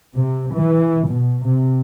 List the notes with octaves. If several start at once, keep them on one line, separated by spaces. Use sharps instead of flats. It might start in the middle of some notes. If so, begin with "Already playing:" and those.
C3
E3
B2
C3